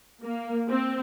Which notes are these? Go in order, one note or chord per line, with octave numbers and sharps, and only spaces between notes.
A#3
C4